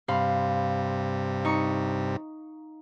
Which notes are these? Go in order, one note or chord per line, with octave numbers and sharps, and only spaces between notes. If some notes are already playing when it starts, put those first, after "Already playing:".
G2 C3 F5 B5 C6
D#4 C#6